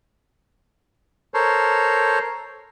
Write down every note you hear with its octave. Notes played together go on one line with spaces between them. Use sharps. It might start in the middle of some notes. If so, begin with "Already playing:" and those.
A4 A#4 C5 C#5